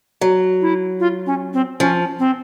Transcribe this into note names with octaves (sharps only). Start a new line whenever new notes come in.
F#3
E4
F4
C#4
C4
F3 C#4
C4